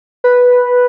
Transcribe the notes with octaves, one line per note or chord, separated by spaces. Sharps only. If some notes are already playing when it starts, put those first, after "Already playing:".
B4